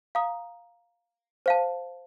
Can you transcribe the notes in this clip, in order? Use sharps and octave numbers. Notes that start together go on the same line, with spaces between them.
F5 A#5 D#6
C5 F5 A5